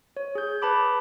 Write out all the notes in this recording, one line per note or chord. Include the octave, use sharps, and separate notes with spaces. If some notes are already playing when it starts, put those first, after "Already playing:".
C#5
G#4 G6
B4 A5 B5 D6